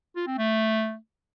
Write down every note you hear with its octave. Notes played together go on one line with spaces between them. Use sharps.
F4
C4
A3